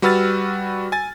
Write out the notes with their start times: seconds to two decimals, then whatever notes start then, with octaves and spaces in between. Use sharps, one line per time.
0.02 G3 F#4 B4 E6 F6 A6
0.92 G#5 A6